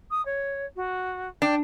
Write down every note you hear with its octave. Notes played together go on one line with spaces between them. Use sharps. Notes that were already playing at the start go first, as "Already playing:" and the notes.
D#6
C#5
F#4
D4 G5